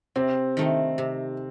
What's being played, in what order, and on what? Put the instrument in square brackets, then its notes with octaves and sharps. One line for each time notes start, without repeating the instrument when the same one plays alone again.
[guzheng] C3 [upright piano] C4
[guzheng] D#3 A3 D#4
C3